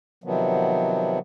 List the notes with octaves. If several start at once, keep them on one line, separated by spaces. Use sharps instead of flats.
C3 D#3 F3 F#3 B3